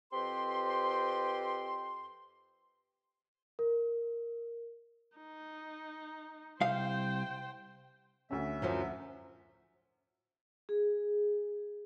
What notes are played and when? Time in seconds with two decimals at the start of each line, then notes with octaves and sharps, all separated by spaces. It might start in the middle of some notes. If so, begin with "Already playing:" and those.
0.12 F2 C4 G4 B4 C6
3.59 A#4
5.17 D#4
6.61 C2 C5 F5 G5
8.31 D2 C#4 E5
8.62 F#2 F3 F#3
10.69 G#4